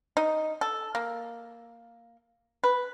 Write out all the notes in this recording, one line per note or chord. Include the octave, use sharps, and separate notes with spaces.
D#4
A4
A#3
B4